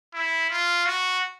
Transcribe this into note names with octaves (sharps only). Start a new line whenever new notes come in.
E4
F4
F#4